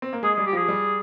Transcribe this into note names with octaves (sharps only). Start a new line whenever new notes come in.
C4
A#3
G#3 G#4
G#4
G3
G4
F3 G#4
G3